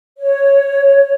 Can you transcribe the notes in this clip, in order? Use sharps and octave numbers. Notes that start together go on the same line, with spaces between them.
C#5